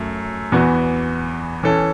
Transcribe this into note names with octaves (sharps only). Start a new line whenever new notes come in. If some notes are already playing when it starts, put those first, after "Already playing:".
Already playing: F#2 F#3 A3
E2 E3 B3 F#4
E3 C#4 A4